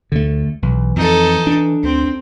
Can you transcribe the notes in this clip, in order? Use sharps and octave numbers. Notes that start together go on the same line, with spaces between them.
D2 D3 A3
B1 E3
F2 D#4 A4
D4
D2 C4